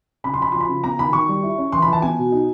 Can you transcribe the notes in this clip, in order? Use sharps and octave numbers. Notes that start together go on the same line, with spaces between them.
C#3 B5
C6
F3 B5
F3 C6
B5
C#3
B3 A#5
D#3 B5
D#3 C#6
G3
E4
C#4
E3 C6
B5
E3 A5
B3 G#5
B2
D#4